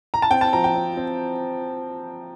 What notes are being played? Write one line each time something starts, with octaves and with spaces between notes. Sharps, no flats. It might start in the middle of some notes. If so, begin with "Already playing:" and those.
A#5
A5
C4 G5
A5
F3 A#5
G5
C4
C4